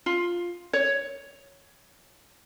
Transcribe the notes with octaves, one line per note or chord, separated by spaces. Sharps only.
F4
C#5